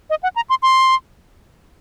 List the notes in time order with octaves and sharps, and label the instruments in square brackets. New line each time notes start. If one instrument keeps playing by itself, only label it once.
[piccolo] D#5
F#5
A#5
C6
C6